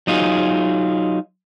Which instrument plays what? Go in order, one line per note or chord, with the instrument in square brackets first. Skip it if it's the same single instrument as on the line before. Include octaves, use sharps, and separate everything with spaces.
[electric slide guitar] F#3 D#4 F4 G#4